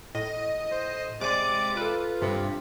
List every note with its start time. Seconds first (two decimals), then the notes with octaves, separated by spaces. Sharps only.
0.15 A2 D#5
0.72 C5
1.21 C3 G#3 D5 D6 D#7
1.77 F4 A4 B4
2.22 G2 C3